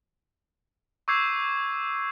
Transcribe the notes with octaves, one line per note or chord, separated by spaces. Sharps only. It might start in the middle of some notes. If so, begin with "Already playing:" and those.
C#6 D6 E6 G6 G#6 C7